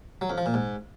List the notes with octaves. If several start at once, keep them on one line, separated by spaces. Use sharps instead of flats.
F#3
F2
F3
A#2
G#2